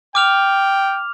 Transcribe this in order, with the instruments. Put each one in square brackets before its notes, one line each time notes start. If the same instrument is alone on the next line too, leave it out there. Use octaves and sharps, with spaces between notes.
[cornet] G5 [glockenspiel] D6 F6 F7